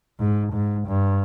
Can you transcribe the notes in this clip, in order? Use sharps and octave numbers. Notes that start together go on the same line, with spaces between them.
G#2
G#2
G2